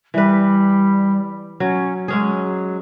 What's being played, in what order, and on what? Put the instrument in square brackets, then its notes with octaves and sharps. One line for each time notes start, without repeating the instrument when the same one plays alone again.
[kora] E3 B4 [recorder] G3
[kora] F#3 [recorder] C#4
[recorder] F#3 [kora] G#3 C#4 G#4